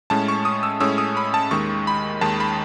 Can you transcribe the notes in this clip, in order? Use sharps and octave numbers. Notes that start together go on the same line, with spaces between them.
A2 G#3 C#4 A5
C#6
D#6
E6
A2 G#3 C#4 E6
D#6
B5
A5
D#2 D#3 G#3 C#6
B5
D#2 D#3 G#3 A5
B5